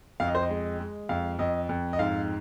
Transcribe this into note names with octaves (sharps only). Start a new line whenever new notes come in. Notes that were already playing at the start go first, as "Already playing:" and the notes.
F2 F5
D#5
C5
D#5
G#3
G#3
F2 F5
F2 D#5
F2
D#5
G#2 F5